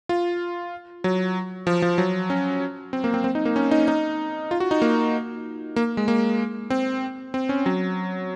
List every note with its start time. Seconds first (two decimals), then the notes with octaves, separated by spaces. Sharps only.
0.09 F4
1.04 F#3
1.67 F3
1.82 F3
1.98 F#3
2.30 C#4
2.93 C4
3.04 A#3
3.14 C4
3.24 C4
3.35 D#4
3.45 A#3
3.56 C#4
3.71 D#4
3.88 D#4
4.51 F4
4.60 F#4
4.71 D#4
4.82 A#3
5.76 A#3
5.97 G#3
6.08 A#3
6.70 C4
7.34 C4
7.49 C#4
7.66 F#3